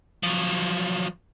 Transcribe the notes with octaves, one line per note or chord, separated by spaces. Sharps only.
F3 F#3